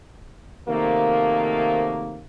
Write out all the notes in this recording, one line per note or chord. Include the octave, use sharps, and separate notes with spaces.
C3 D#3 F3 F#3 A3 A#3